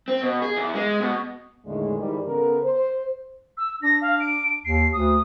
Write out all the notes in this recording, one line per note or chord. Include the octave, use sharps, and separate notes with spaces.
C4
B2
G#4
E2
G#3
B2
E2 A2 D3 D#3 G#3
G#2 D#3 E3 G3
C#3 B3 A4 A#4
C5
E6
D4 A#6
F5
D7
D#2 C7
D2 D#6